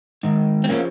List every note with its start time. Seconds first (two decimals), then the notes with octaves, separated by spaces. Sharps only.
0.23 G#2 D#3
0.64 C4
0.69 C#3 F3 A#3 C#4